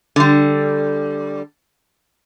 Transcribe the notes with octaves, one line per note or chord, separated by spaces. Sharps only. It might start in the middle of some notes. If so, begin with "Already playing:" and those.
D3 G3